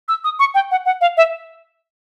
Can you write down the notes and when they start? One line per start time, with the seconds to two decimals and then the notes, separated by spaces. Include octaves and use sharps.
0.08 E6
0.24 D#6
0.39 C#6
0.55 G5
0.71 F#5
0.86 F#5
1.01 F5
1.17 E5